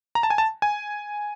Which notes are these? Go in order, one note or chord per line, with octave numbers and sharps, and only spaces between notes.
A#5
A5
G#5
A5
G#5